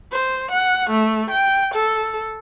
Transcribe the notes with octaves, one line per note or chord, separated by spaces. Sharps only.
C5
F#5
A3
G5
A4